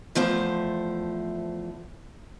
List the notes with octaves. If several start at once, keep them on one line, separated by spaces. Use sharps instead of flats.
E2 F3 A3 C5